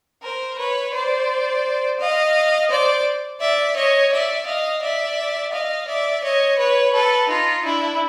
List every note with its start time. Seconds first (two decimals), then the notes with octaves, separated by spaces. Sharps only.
0.23 A#4 C5
0.58 B4 C#5
0.93 C5 D5
2.00 D#5 F5
2.70 C5 D5
3.40 D5 E5
3.76 C#5 D#5
4.11 D5 E5
4.46 D#5 F5
4.82 D5 E5
5.52 D#5 F5
5.88 D5 E5
6.23 C#5 D#5
6.58 B4 C#5
6.93 A4 B4
7.29 D#4 F4
7.65 D4 E4